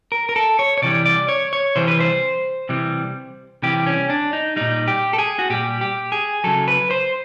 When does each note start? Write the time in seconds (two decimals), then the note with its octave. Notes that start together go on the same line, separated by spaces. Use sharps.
0.12 A#4
0.29 A#4
0.36 A4
0.59 C#5
0.78 C#5
0.82 C3 E3 G3 D5
1.06 D5
1.29 C#5
1.53 C#5
1.76 C3 E3 G3 C5
1.88 B4
2.00 C5
2.69 C3 E3 G3
3.63 C3 E3 G3 G4
3.87 C#4
4.10 D4
4.33 D#4
4.56 A#2 G3 D#4
4.88 G4
5.13 A4
5.19 G#4
5.39 F#4
5.50 A#2 G3 G4
5.81 G4
6.12 G#4
6.44 C#3 F#3 A4
6.68 B4
6.91 C5